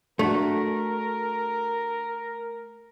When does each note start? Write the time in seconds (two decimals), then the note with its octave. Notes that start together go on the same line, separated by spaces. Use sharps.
0.19 A3 D4 F#4 A#4